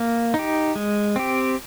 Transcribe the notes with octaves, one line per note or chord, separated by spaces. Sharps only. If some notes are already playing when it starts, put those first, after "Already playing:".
Already playing: A#3
D#4
G4
G#3
C4 G4